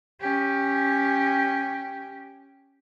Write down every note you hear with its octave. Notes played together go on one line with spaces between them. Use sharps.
C#4 G4